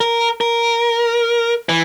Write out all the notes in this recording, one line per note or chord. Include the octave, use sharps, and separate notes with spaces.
A#4
A#4
E3